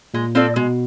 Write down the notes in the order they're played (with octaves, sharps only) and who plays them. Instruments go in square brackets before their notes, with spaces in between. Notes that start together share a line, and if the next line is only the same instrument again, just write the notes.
[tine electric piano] A#2 [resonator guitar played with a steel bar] G#3
[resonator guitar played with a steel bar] C4 F4 A4 D5
[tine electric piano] B2 [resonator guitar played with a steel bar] G#3